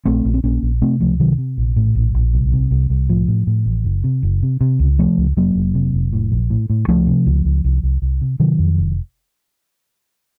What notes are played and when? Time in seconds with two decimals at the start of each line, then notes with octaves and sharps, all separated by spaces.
0.05 A#1 A3 C4
0.25 A#1
0.34 C4
0.43 A#1 A#3 C#4
0.62 A#1
0.81 C3 A3 C4
1.00 C#2 F3 A3
1.20 C3 D#3 F#3
1.38 C3
1.58 A#1
1.76 A2
1.95 A#1
2.14 A#1
2.33 C2
2.52 C3
2.71 C2
2.90 C2
3.09 A2 F3
3.28 A2
3.47 A2
3.66 A1
3.85 F#1
4.04 C3
4.23 F#1
4.43 C3
4.61 C3
4.80 C#2
4.99 C3 F3 A3
5.18 C#2
5.37 F1 F#3 A#3
5.55 F1
5.75 C3
5.94 F1
6.13 A2
6.32 A#1
6.50 A2
6.70 A2
6.88 C#2 F3 A3
7.07 C3
7.26 C#2
7.45 C#2
7.64 C2
7.83 C2
8.02 C2
8.21 C3
8.40 C3 D#3 F#3
8.59 F2
8.78 F1